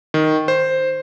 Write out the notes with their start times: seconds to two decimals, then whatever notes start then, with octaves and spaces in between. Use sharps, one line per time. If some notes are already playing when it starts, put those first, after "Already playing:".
0.14 D#3
0.48 C5